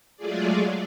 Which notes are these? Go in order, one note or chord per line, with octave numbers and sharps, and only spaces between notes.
F#3 G#3 A3 F4 G#4 D5